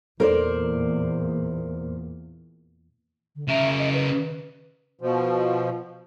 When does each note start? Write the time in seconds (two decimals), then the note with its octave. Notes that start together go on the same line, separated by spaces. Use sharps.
0.20 E2 A#2 A4 A#4 C5 D5
3.36 D3
3.48 C#3 A#4 E5
3.78 D#5
3.94 B4
5.01 B2 F3